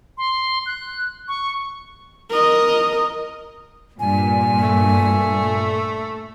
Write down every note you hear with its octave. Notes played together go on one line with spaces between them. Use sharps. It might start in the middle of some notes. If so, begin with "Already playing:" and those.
C6
F#6
C#6
A#4 D#5
G2 A#2 G#5
A3